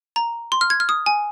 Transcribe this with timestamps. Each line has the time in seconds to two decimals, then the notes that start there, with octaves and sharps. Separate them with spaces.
0.16 A#5
0.52 C6
0.61 F6
0.70 G#6
0.80 F6
0.89 D#6
1.06 G#5